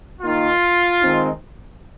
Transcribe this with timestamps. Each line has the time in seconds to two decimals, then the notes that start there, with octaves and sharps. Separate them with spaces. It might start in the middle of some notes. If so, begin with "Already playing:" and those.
0.22 D#3 A#3 D#4 F4
1.02 D#3 G#3 C4 D#4